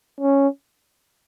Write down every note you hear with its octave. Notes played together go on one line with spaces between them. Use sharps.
C#4